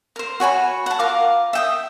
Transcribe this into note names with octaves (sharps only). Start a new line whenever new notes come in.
A#4 C5
F#4 C#5 G#5 B5
F#5 A5
F4 A#4 F5 D6
E5 G5 D#6